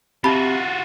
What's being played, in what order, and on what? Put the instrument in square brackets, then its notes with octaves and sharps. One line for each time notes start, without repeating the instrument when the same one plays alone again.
[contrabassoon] C3 [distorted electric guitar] F4 F#4 [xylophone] A5 B5